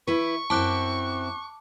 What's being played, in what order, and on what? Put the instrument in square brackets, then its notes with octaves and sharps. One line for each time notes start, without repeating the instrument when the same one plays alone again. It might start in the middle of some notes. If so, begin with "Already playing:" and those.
[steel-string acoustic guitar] E4 B4 [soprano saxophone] C#6
[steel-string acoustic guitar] F#2 C4 E4 [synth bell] A5 D6 F#6